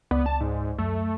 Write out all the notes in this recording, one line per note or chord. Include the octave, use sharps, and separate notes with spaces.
C#2 B3 D5
A5
G#2
F#2 A3